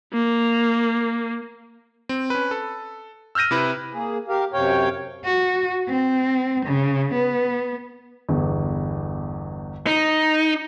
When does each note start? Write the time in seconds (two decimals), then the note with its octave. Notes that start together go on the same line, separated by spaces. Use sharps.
0.13 A#3
2.09 C4
2.30 C#4 B4
2.51 A4
3.35 E6 F6 G6 A#6 D#7
3.51 C3 E4 B4
3.93 A#3 G#4
4.28 G4 A#4 F5
4.53 F#2 C3 C#5 F5 G5
5.25 F#4
5.89 C4
6.66 C#3
7.14 B3
8.29 G1 E2
9.87 D#4